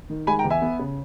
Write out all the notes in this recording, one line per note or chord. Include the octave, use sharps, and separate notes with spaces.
D#3
G#3 G#5 B5
G5 A#5
E2
E5 G#5
B3
C#3